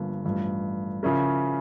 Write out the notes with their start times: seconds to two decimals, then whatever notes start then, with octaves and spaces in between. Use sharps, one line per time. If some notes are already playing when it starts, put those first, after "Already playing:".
Already playing: G1 G2 D3 F3 A#3
0.25 A1 G2 F3 A3
1.03 C#3 F3 C#4 E4 A#4